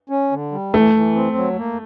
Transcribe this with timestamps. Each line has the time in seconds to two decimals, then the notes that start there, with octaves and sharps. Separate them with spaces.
0.09 C#4
0.31 D3
0.52 G3
0.73 E3 A3
0.95 E3
1.15 C4
1.37 F#3
1.57 A#3